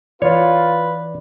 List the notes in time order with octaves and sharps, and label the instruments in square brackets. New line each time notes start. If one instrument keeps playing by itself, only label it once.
[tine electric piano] E3 D5 [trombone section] F4 [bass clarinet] B4 [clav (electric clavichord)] C#5